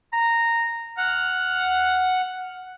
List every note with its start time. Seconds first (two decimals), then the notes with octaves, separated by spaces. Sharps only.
0.13 A#5
0.98 F#5 F6